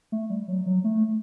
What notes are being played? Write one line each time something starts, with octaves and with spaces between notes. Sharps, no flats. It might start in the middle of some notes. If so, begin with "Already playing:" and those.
A3
G3
F#3
F#3
A3